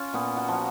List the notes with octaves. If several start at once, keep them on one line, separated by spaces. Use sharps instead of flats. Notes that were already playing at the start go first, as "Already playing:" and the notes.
Already playing: C#4 F4
A#2 B3
F#4
F3 F#4